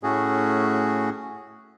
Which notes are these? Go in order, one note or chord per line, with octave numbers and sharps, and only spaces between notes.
A2 A3 C#4 F#4 G#4